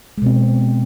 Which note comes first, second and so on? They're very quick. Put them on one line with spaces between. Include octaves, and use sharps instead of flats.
G#3 B2 C4